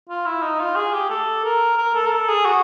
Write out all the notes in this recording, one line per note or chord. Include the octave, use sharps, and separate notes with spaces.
F4
E4
D#4
F4
G#4
G4
A4
A#4
A#4
A4
A#4
A4
G#4
F#4